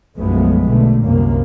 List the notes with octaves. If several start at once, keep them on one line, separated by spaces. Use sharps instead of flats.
B1 F#2 F3 G#3 A3 B3
B2 D3 A3
C2 F#2 A#3